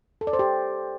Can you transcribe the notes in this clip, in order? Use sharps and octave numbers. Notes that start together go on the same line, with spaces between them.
A4
D5
C5
G4